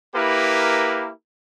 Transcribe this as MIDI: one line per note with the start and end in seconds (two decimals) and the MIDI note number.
0.14 1.10 58
0.14 1.10 64
0.14 1.10 67
0.14 1.10 70
0.14 1.10 71